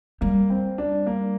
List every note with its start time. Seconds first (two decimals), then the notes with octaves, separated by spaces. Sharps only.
0.21 G3 A#3
0.50 C4
0.78 D4
1.06 A#3